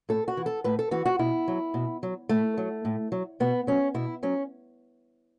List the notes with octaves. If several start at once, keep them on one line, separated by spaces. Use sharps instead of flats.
A2 A4
F#4
E3
A4
A2 B4
A4
E3 F#4
F#4
B2 E4
F#3
B2
F#3
A2 A3
F#3
A2
F#3
B2 B3
F#3 C#4
B2 E4
F#3 C#4